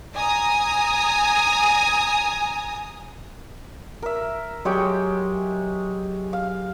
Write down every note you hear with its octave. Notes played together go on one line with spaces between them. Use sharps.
G#5 A#5 D#6
A#4 E5
F#3 G#3 G4 C#5 G5
F5